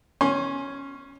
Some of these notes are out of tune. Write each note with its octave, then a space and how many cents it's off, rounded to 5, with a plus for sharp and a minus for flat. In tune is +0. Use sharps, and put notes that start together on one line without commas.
C#4 +0 G#5 +0 C6 +35